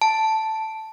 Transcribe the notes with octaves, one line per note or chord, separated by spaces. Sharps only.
A5